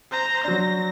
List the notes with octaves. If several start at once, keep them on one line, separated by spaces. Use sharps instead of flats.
C5 A#5
F#3 D4 A#6